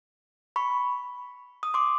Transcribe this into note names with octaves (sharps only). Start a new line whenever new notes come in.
B5 C#6
D#6
C6 D6